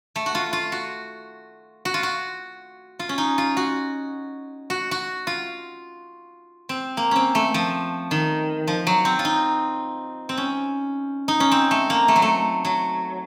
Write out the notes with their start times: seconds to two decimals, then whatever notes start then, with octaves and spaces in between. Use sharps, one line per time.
0.16 A3
0.26 F#4
0.35 F4
0.53 F4
0.72 F#4
1.85 F#4
1.94 F4
2.03 F#4
2.99 F4
3.09 C#4
3.18 D#4
3.38 F4
3.57 F#4
4.70 F#4
4.91 F#4
5.27 F4
6.69 C4
6.97 A#3
7.11 C4 C#4
7.35 A3
7.54 F3
8.11 D#3
8.67 F3
8.87 F#3
9.05 C4
9.19 F4
9.25 D#4
10.29 C4
10.37 C#4
11.28 D#4
11.40 C#4
11.51 C4
11.71 A3
11.90 A#3
12.08 A3
12.16 F#3
12.22 A3
12.65 F#3